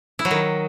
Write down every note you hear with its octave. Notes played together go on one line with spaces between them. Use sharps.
E4
F#3
D#3